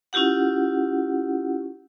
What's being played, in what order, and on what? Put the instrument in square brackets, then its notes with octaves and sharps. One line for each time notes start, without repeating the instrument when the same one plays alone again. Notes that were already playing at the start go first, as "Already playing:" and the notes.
[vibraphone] C#4 E4 F4 G4 F#5